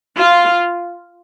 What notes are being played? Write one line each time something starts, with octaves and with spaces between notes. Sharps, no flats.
F4